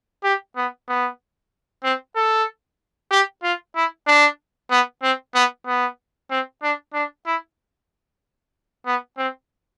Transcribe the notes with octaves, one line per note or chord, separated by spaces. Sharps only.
G4
B3
B3
C4
A4
G4
F4
E4
D4
B3
C4
B3
B3
C4
D4
D4
E4
B3
C4